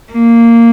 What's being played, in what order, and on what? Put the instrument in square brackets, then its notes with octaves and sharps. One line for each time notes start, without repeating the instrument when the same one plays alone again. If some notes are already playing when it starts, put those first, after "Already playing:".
[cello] A#3